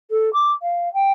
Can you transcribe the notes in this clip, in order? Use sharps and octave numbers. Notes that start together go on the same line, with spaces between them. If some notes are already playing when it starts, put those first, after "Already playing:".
A4
D6
F5
G5